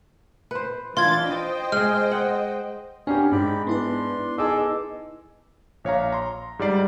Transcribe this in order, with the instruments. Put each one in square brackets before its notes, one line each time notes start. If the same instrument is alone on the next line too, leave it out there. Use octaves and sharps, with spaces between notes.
[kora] B4 C5
[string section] E3 D4 A6 [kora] F4 [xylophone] C6 G#6
[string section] C5 D#5 G5
[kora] G#3 G#4 [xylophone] F6
[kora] F#5
[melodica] B3 A#4 F5 [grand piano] C#4 G4 [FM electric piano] D4
[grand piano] G#2 [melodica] D5 G5 B5
[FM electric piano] B3 E4 B4 [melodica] D4 C6
[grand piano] D#4 G#4 [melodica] A4 D6 E6
[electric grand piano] A#1 C#5 F5 A#5
A#5 C6
G#2 G3 D#4 D5 C7